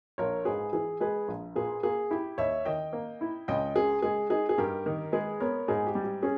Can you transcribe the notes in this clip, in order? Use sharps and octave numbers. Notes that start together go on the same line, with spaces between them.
A#1 A#4 C#5
G#2 G#4 B4
E3 G#4
G#3 G#4 B4
A#1
A#2 G#4 B4
A#3 G#4
E4 G4
D#2 C#5 E5
D#3 D#5 G5
A#3
E4
C#2 D#5 G5
C#3 G#4
G#3 G#4
D#4 G#4
G#4
G2 G4 A#4
D#3
G#3 G#4 B4
B3 A#4 C#5
G#2 G#4
G4
G3
G4
C#4 G#4